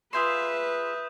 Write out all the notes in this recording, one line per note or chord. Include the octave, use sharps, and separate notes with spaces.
F4 G#4 B4 E5 C6 D#6 G6 E7